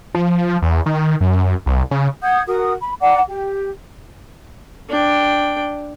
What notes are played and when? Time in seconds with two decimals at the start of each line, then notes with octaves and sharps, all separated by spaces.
0.15 F3
0.62 E2
0.86 D#3
1.21 F#2
1.66 C2
1.91 C#3
2.22 F#5 D#6 G6 G#6
2.47 F#4 A#4 D#6
2.81 B5
3.01 D5 F#5 A#5 D6
3.28 G4
4.89 D4 G5